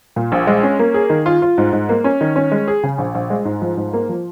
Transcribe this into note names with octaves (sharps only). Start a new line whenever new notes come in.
A#2
A#1
G#3
C#4
A#3
G#4
D#3
F4
F4
G#2
G#2
A#3
C#4
D#3
C#4
G#3
G#4
C#3
A#1
A#1
G#3
G#2
F3
G#2
A#3
F3